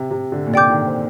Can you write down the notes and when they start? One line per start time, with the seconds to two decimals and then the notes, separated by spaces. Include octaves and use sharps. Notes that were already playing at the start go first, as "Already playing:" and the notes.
Already playing: C3
0.11 C3
0.32 D3
0.47 A#2
0.54 C3 D5 G5 D6 G6
0.70 D#3
0.87 C4